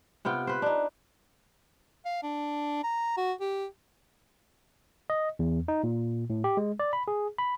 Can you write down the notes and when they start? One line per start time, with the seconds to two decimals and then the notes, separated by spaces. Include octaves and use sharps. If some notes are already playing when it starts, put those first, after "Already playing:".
0.25 C3 B3 F4 G5
0.47 B4 C5
0.62 D4 D#4
2.05 F5
2.23 D4
2.84 A#5
3.17 F#4
3.41 G4
5.10 D#5
5.39 E2
5.68 D#4
5.84 A#2
6.30 A2
6.44 G4
6.57 G#3
6.80 D5
6.93 B5
7.08 G#4
7.38 B5